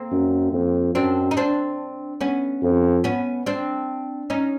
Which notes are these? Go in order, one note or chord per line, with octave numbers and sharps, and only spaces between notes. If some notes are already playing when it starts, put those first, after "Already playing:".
Already playing: A#3 C4
F#2
F2
F#2 C4 D4
D#4
C4 D4
B3 C#4
F2
B3 C#4
C4 D4
C#4 D#4